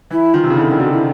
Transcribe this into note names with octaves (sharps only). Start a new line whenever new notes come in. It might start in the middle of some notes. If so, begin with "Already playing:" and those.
E3 E4
D#3 F4
C3
C#3
D3 E4
D#3
D3 F#4
E4